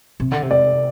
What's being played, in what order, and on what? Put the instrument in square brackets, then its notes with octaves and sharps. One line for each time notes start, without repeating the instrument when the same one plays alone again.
[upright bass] C3
D3
C3
[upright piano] D5